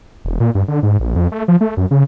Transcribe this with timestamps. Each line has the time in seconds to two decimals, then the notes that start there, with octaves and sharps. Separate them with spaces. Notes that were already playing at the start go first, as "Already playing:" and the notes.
0.25 E1
0.40 A#2
0.55 G2
0.68 D3
0.83 G#2
1.00 A#1
1.16 F2
1.32 A3
1.48 F3
1.61 A3
1.77 F#2
1.91 C#3